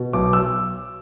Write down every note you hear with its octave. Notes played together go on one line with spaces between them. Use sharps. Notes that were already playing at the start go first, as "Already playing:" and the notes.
Already playing: B2
B1 D6
E6